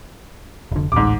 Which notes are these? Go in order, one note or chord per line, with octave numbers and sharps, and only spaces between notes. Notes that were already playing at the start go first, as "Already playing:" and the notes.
F1 D3
D1 A1 G#2 D6